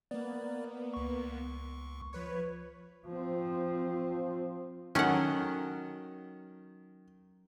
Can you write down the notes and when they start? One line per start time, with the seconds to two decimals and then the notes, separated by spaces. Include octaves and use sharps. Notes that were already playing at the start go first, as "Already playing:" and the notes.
0.11 A#3 B3 D5
0.94 C#2 C#6
2.13 F3 B4 C#5
3.07 F3 C4
4.95 D#3 F#3 C#4 A4 F#5